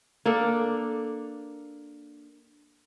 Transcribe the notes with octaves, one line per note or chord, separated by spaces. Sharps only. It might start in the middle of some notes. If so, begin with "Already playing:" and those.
A#3 D4 A4